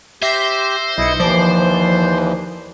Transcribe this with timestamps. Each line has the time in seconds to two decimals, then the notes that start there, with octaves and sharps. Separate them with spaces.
0.22 G4 C5 E5 G6 A#6
0.98 B1 E4 D#5 C#7
1.20 D#2 E3 F3 D5